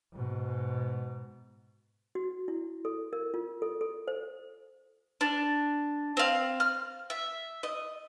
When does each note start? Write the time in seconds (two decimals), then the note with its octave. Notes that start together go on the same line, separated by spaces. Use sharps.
0.13 G#2 B2
2.15 F#4
2.48 E4
2.85 A4
3.13 A#4
3.34 F4
3.62 A4
3.81 A4
4.08 C5
5.21 D4
6.17 C4 F5
6.60 F6
7.10 E5
7.63 D#5